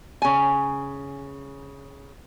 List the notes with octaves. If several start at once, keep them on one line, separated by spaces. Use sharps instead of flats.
C#3 G#5